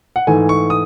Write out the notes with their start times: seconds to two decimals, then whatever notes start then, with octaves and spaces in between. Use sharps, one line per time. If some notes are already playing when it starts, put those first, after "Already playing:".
0.16 F#5
0.27 G#2 E3 A3 G#5
0.49 C#6
0.70 D#6